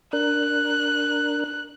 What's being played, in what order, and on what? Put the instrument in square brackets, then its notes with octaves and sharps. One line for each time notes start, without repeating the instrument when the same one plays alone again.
[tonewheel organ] D4 A#4 [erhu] F#6